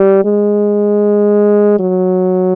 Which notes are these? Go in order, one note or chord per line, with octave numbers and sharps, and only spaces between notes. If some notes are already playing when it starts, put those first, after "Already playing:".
Already playing: G3
G#3
F#3